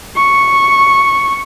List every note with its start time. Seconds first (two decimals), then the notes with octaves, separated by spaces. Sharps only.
0.16 C#6